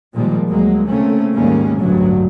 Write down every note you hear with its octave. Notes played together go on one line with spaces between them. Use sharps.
A#2 D#3 F3 G3 G#3
D2 F#3 G#3 A#3
C#3 A3 A#3 C4 C#4
G#1 D#2 G3 G#3 A#3 C#4
A1 D2 G2 A#2 F#3